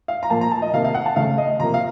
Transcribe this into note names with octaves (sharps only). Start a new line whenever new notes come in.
F5
A#5
A#2 F3 A#3 A5
A#5
A5
D#5
C3 D#3 A#3 F5
F5
F#5
A5
C#3 A3 F5
D#5
C3 F3 A#3 A#5
F5